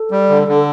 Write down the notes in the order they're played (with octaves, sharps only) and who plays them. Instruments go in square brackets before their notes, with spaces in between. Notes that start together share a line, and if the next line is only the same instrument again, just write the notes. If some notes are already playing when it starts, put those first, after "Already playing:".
Already playing: [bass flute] A4
[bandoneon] G3
D3
D3